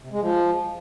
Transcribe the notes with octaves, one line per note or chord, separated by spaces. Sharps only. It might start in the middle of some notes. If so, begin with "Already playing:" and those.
C3
G#3
F3